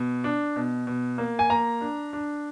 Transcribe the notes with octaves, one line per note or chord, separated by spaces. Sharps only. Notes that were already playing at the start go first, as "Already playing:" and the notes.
Already playing: B2
D4
B2
B2
A#3
G#5
A#3 A#5
D4
D4